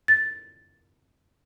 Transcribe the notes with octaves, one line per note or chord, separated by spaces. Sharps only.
A6